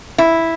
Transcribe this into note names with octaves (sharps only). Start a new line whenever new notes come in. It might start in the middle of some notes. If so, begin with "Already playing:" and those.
E4